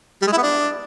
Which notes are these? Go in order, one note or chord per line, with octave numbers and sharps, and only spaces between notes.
G3
G#3
E4
B3
D4